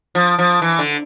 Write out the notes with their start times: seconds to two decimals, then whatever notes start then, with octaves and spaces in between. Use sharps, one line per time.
0.15 F3
0.39 F3
0.62 E3
0.79 D3